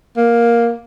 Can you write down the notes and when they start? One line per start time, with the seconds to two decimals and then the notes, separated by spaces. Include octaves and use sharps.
0.17 A#3